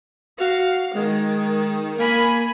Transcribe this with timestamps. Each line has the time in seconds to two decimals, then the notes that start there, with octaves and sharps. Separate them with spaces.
0.41 F#4 F5
0.96 D#3 G#3
1.99 A#3 A#4 G#5 B5